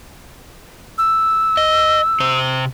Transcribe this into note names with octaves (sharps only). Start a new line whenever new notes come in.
E6
D#5
C3 C5